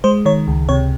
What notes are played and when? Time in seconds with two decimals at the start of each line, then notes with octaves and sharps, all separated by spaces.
0.04 G#3 C5
0.25 D#3 C#5
0.47 C#2
0.69 C3 C#5